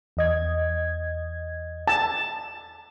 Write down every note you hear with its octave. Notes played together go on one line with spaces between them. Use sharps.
E2 D#5 G#6
A5